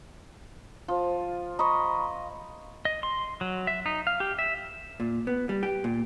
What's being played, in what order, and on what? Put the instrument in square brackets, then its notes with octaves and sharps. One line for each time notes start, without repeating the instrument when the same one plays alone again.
[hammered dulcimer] F3
[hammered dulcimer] D#5 [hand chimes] A#5 B5 C#6
[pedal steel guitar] D#5
C6
F#3
E5
D#4
F5
G4
E5
[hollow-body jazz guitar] A#2
B3
G3
G4
A#2